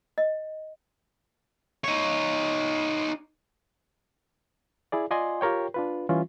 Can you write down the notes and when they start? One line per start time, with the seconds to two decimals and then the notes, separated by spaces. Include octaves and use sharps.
0.18 D#5
1.84 D#4 C#5
4.92 E4 G#4 D5
5.11 F4 D5 D#5 G#5 C6
5.41 F4 G4 A#4 C#5 G5
5.74 D4 F4 B4
6.09 E3 G3 C#4 E4 F4